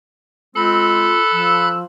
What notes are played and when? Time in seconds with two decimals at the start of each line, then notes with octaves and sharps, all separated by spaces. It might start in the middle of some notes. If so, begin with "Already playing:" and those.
0.56 G#3 C4 F4 A4 B5 F#6
1.32 F3 E6